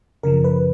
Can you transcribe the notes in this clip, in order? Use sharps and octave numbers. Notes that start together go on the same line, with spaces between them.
F#2 C#3 F3 A#4
B4